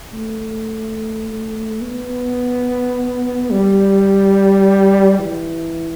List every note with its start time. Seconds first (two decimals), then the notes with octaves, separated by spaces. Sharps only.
0.13 A3
1.82 B3
3.50 G3
5.19 E3